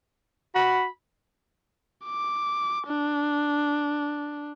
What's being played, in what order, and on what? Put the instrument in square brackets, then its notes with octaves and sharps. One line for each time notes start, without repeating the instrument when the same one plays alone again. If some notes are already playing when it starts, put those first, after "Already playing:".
[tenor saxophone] F#4 [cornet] B5
[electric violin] D6
D4